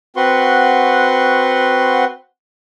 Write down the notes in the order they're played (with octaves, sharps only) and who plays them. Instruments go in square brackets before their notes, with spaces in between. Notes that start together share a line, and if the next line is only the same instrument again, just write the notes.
[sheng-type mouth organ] C4 F#4 B4 F#5 C6 C#6